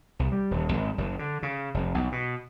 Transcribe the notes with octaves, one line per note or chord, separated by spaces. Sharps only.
C2
G3
D#1
G#1
F#1
D3
C#3
F1
B1
B2